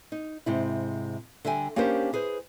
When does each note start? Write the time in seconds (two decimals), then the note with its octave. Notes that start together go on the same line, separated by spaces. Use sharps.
0.12 D#4
0.46 G#2 C3 E4
1.45 D3 G3 E5 G5 G#5
1.76 A#3 C#4 D4 G4 A#4 C5
2.13 E4 G#4 B4 C5